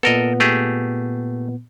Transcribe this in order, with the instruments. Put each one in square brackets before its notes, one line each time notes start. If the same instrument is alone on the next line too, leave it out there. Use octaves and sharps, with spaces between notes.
[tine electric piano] A#2 B3 [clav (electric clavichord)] A4 A#4 D#5
[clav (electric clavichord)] A3 G4 G#4